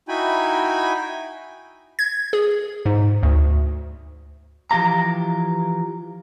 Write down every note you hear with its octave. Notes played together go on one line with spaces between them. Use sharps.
D#4 E4 F#4 G5 G#5 B5
G#6
G#4
G#2
D2
E3 F3 G4 F5 A#5